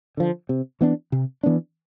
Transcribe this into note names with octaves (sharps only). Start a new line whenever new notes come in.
D3 F3
C3
E3 B3 D4
C3
E3 B3 D4